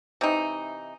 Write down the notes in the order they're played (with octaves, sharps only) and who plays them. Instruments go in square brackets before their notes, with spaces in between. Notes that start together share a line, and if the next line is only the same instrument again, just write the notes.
[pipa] C3 E3 D#4